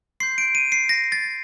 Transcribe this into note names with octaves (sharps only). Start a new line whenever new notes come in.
C6 G6 C7
D7
D#7
C7
A#6
A6